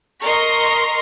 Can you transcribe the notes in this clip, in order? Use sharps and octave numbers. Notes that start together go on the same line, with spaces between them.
A#4 D#5 C6 C#6 A#6